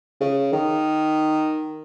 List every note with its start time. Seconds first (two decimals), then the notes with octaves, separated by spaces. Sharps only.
0.21 C#3
0.52 D#3